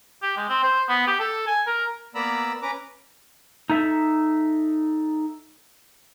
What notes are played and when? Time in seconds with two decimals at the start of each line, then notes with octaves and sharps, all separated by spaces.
0.22 G4
0.37 G#3
0.49 C4
0.63 C5
0.89 B3
1.07 G4
1.19 A4
1.47 G#5
1.67 A#4
2.15 A#3 B3 D5 A#5 B5 E6
2.62 C#4 B4 A#5 D6
3.69 D#4 A4 E5